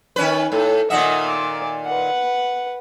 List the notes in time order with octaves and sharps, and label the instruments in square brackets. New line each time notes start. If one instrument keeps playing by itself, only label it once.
[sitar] D#3 C#4 B4
[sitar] A2 [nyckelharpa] A4
[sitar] A#2 D#3 E5 [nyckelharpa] D#5 F#5
[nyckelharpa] D5
B4 F#5